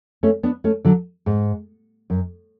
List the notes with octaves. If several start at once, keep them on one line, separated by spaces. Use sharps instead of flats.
A3 C#4
B3 D4
A3 C#4
D3 F#3
G#2
F#2